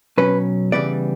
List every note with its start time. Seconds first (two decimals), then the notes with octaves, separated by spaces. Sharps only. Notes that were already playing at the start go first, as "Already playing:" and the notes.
0.18 B2 F#3 C#4 B4
0.72 C#3 E3 G3 B3 D5